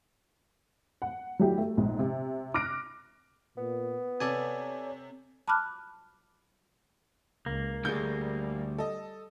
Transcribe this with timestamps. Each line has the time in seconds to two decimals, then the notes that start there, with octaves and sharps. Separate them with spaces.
1.02 F#5
1.39 F#3 G3 A3 E4 G4
1.58 A3
1.77 A#1 G#2
1.99 C3
2.54 D6 F6 F#6 A#6 D7
3.57 A#2 B3
4.20 C3 A4 C#5 D5 G#5
5.48 A5 B5 D6 F6 F#6
7.46 C#2 A#3
7.85 D2 G3 G#4 G6
8.78 A4 D#5